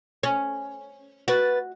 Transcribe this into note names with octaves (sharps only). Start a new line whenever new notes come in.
C#4
F#4 B4 A6